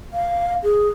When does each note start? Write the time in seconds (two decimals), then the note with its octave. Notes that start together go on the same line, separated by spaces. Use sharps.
0.13 F5
0.63 G#4